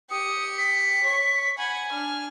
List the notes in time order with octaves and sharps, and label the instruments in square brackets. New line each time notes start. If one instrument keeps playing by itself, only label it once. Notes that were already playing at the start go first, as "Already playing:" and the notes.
[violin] G4 C#7 [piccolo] D#6
[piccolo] B6
[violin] C#5 C#6
[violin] F#5 B5 [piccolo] G#5
[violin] D4 F6